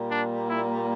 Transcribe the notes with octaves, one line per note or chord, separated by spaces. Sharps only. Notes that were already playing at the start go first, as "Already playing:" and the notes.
Already playing: A#2 G3 A#3
D4
E4